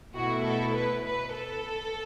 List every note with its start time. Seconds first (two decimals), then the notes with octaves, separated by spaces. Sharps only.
0.14 B2 A3 E4 F#4
0.43 A4
0.74 B4
1.03 B4
1.33 A4